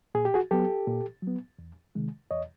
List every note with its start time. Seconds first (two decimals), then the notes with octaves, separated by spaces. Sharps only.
0.15 A#2 G#4
0.25 G4
0.34 F#4 G#4
0.51 F#3 B3 G4 A4
0.87 A#2
1.22 F#3
1.27 B3
1.59 E2
1.95 C3 D#3 G#3
2.31 E2 C#5 D#5